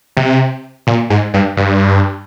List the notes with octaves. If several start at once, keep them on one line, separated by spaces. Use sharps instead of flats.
C3
A#2
G#2
G2
G2